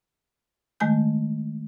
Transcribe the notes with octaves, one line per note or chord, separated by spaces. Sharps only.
D#3 G#3 A3 G#5 G6